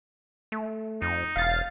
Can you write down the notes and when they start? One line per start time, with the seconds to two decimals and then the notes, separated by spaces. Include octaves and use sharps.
0.52 A3
1.02 F2 D#4
1.36 E1 F5 A6